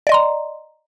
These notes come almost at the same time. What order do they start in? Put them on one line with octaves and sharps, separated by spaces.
D5 D#5 C6 A#5